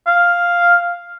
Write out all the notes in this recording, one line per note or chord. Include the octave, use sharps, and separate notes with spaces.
F5